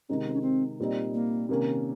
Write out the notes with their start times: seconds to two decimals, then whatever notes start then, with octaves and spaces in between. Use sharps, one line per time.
0.09 C3 D#3 G#3 C#4 D#4
0.26 C4
0.34 C#4
0.41 C4
0.80 A#2 G3 C4 D#4
1.14 A#3
1.49 C3 D#3 A#3 C#4